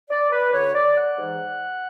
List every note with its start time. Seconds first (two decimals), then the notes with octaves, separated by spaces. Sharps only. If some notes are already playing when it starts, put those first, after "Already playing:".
0.10 D5
0.31 B4
0.53 D2 D3 C#5
0.74 D5
0.96 F#5
1.17 G#2 E3